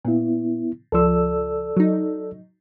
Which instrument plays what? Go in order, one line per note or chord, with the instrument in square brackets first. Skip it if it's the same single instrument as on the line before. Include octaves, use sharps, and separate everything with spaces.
[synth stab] A#2 [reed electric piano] B3 E4
[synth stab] C#2 F3 [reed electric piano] A4 D5 E6
[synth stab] F#3 D#4